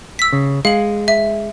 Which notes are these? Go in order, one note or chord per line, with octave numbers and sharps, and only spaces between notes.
E6 B6
C#3
G#3 F5 F#7
E5